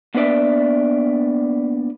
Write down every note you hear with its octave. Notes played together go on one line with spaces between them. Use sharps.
A#3 B3 D4 B4 D5 E5